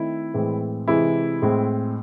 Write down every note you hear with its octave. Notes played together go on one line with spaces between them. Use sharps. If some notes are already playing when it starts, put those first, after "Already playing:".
Already playing: D#3 A3 C4 E4
A2 E3 G#3 C4
C3 E3 G#3 E4
A2 G#3 C4